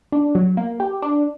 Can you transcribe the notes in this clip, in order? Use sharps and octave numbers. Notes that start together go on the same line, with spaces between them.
D4
F#3
A#3
G4
D4